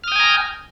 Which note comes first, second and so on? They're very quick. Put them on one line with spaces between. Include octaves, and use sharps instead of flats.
F6 D#6 G5 G#5 A#5